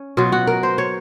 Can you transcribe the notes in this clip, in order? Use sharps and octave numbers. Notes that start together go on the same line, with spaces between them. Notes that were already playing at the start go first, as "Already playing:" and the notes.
Already playing: C#4
B2 F#3 F4
F#4
A#4
C5
C#5